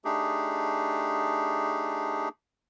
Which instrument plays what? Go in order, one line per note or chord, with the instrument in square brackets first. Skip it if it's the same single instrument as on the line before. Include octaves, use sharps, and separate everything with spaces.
[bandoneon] A3 D4 D#4 G4 G#4